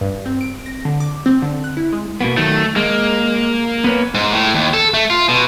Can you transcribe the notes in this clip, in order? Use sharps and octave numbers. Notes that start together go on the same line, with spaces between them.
G2
C4
D7
A#6
D3
D6
C4
D3
F#6
E4
G#3
B2 A#3 B3
D#3 F#3 A3
G#3 A#3
B3 B4 C#5
G#2
A2
D#2
A4
A3
F4
B2